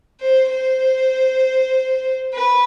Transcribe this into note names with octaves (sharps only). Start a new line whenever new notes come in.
C5
C5
B4